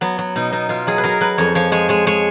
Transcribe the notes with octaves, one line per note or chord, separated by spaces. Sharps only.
F#3 B3
F#3
B2 D#4
B2 D#4
B2 F4
F#3 G#4
B4
F#3 A#4
F#3 B4
F2 C#5
F3 C#5
G#3 C#5
G#3 C#5
G#3 C#5